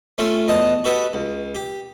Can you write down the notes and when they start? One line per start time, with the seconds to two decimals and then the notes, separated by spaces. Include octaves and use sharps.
0.18 A3 C#4 F4 A4
0.48 E2 D#4 D#5 A5 D#6
0.84 F#4 G4 A4 B4 D#5
1.13 C#2
1.55 G4